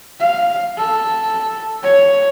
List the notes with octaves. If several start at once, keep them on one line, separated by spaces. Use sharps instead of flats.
F5
A4
C#5